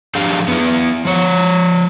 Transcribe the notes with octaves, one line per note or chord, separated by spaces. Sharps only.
F#2 F3 D4 G4 G#4 F5
B3 E4
F3 C#5